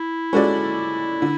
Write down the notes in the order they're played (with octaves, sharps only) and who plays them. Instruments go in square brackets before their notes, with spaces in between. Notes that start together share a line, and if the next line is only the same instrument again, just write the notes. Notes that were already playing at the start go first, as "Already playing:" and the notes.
Already playing: [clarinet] E4
[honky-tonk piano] G#3 C#4 F#4 A4 D5
D3